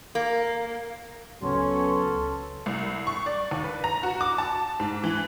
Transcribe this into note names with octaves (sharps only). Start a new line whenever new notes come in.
A#3
C#2 F#3 B3 C#4 A4 C6
C2
C#6
D5
D#2
B4
A#5
F#4
D6
A5
G#2
E3